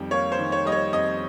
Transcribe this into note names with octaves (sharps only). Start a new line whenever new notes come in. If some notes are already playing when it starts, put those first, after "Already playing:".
Already playing: F2 D#3 G3
A#3 C#5
C5
D#3
C#5
G3 D#5
C#5
F2 D#5